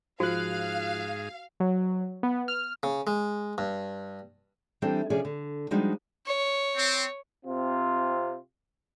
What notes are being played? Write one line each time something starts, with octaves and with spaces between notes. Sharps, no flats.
G#2 F3 F#4 G#4 F5 F#6
F#3
B3
F6
C#3
G#3
G2
E3 G3 C4 D4 A4
C3 F3 C#4 G#4 D5 G#5
D3
F3 G3 G#3 D4 D#4 F#4
C#5
C4
C3 C4 F4